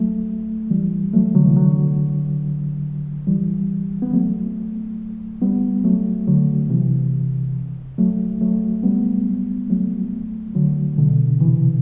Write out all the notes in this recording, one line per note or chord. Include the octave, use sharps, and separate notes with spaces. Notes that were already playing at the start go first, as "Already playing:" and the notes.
Already playing: F#3 A3
E3 G3
F#3 A3
D3 F#3
C3 E3
D3 F#3
E3 G3
B3
F#3 A3
G3 B3
F#3 A3
D3 F#3
C3 E3
F#3 A3
F#3 A3
G3 B3
F#3 A3
D3 F#3
B2 D3
C3 E3